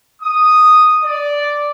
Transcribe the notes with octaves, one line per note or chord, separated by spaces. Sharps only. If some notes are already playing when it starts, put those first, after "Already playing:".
D#6
D5